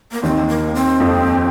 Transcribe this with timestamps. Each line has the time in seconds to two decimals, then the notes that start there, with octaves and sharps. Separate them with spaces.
0.12 A#3
0.23 D#2 D#3 C4
0.48 A#3
0.75 C4
1.00 F2 F3